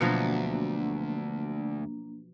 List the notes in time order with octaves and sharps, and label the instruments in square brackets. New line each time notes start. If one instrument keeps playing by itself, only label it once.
[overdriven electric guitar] D2 [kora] B2 F3 F#3 [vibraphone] A#3 D4